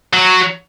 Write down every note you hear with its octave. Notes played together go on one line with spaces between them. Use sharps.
F#3